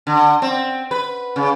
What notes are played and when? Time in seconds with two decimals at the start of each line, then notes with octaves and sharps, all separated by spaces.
0.07 D3
0.42 C4
0.91 B4
1.36 C#3